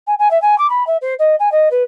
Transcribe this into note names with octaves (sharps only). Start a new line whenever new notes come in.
G#5
G#5
E5
G#5
D6
B5
E5
C5
D#5
G#5
D#5
B4